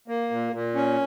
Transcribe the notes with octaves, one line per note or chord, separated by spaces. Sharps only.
A#3
A#2
A#2
C#4